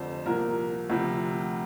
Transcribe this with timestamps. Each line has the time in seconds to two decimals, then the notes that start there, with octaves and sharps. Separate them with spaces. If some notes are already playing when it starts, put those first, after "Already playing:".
Already playing: F1 F2 D3 C5
0.26 C2 A#2 F3 A#4
0.90 D2 C3 F3